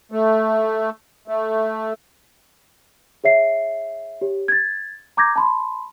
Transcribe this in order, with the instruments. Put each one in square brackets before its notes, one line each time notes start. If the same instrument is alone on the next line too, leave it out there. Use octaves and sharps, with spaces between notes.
[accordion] A3
A3
[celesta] G#4 C#5 E5 C7
G4 C#5
G#6 A6
A#5 D6 G6 G#6 A#6
A5 B5 C6